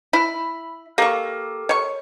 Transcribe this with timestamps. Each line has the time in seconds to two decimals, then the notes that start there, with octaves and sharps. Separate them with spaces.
0.13 E4 B5
0.98 A#3 G4 A4 A#4 C#6
1.69 C#5 C#6